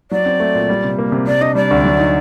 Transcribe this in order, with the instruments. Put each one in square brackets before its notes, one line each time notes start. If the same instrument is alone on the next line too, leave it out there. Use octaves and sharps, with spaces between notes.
[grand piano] F#3 [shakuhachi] D5
[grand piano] C4
A3
A#2
G3
C3
A#3
C3
[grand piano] C3 [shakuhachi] D5
[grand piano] D4 [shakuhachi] D#5
[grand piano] G3 [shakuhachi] D5
[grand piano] D2
F#3
D#4